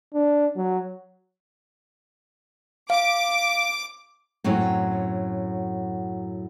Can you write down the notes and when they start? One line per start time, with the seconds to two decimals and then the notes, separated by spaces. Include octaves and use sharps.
0.14 D4
0.56 F#3
2.90 F5 D6
4.44 F#2 A2 F#3 C4 C#4